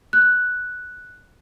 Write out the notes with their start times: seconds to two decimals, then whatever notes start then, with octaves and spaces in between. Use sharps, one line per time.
0.13 F#6